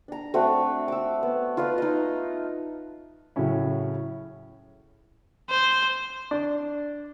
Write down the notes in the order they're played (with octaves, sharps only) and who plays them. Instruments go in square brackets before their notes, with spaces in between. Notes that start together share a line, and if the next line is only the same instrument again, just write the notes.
[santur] D4 A#5
A3 C4 D4 F#4
D6 E6
B3
F4 B4 D#5 F5
D#4 D#5
[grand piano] A2 C#3 F#3 C#4 E4
[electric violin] C5
[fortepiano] D4